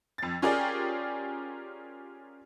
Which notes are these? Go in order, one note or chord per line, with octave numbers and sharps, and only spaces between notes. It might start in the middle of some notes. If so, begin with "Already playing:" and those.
F2 A6
C#4 F4 G4 G#4 A#4 D5